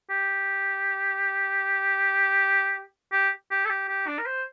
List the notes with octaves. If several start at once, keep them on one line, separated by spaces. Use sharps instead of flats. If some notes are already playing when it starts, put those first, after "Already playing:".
G4
G4
G4
A4
G4
G4
D4
A#4
C5